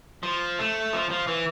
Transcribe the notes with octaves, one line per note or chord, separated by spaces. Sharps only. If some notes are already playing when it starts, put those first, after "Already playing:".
F3
A3
F3
F3
E3